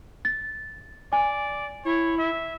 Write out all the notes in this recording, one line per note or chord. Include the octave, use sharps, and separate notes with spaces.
A6
D5 G#5
E4 C#5
E5